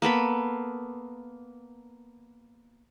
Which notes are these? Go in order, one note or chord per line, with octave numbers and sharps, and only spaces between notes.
A#3 B3 A4 B5